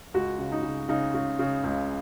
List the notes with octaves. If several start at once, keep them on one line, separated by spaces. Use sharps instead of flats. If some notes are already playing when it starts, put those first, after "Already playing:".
C#2 F#4
C#3
D#4
C#3
C#3 D#4
C#3
C#3
C#2